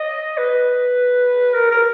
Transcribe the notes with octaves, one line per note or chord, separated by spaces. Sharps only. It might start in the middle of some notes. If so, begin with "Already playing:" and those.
Already playing: D#5
B4
A#4
A#4